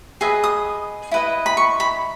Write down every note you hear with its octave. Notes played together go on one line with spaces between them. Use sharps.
G#4 B4 D#5 E5
D#6
E4 B4 D#5
B5
C#6
B5